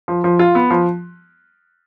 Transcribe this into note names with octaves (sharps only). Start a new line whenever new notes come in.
F3
F3
F4
B3
F3